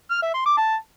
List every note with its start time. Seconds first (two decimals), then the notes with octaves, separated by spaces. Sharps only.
0.11 F6
0.22 E5
0.34 C6
0.46 D6
0.57 A5